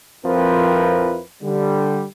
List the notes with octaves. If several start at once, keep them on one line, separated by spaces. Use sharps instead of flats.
F2 F3 C4 E4 A#4 B4
D3 G3